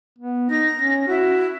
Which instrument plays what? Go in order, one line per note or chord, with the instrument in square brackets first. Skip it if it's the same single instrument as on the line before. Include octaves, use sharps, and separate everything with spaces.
[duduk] B3
[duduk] D#4 [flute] A#6
[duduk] C#4
[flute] E4 [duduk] F#4